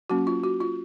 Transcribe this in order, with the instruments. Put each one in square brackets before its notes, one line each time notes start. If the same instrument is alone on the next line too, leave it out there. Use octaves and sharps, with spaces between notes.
[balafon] F#3 A#3 C#4 F#4
F4
F#4
F4